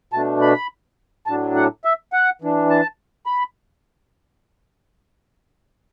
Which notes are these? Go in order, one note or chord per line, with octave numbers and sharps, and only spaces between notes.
B2 A3 D4 A5
B5
A2 F#3 D4 A5
F#5
E5
F#5
E3 D4
A5
B5